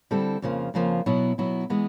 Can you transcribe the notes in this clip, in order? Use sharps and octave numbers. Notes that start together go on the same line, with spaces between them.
D3 G3 C4 E4 A4
F2 C#3 F3 A#3
F2 C#3 F3 A#3
B2 F#3 B3 E4
B2 F#3 B3 E4
E3 G#3 B3